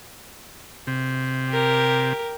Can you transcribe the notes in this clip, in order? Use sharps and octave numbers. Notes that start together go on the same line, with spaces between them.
C3
G4 A#4